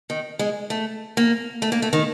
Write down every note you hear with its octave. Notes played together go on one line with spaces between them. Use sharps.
D#3
G#3
A3
A#3
A3
A#3
A3
D#3